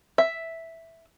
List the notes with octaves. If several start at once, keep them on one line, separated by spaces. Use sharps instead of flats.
E5